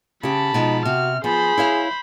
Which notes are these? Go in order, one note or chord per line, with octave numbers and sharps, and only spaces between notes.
C#3 G4 A5 B5
B2 F3 G#3 D#4
C3 F#4 F6
F3 B3 G#4 C5 B5
E4 C#5 F5